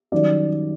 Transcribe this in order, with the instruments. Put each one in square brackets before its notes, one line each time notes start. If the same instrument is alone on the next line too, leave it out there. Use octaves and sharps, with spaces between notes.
[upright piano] F#2 D#3 G3 D5